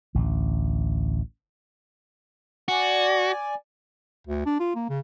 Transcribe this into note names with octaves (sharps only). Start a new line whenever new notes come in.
A1 D2
F#4 D5 G#5
D2
D4
F4
A#3
C#3